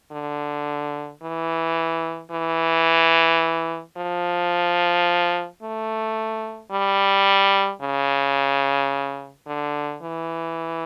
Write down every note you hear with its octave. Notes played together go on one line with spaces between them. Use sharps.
D3
E3
E3
F3
A3
G3
C#3
D3
E3